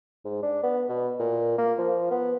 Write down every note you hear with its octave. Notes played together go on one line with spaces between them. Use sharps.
G#2
D4
B3
B2
A#2
A#3
F3
B3